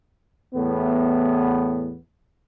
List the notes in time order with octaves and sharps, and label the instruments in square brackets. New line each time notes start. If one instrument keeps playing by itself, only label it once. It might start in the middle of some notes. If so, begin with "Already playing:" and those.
[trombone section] E2 A2 B3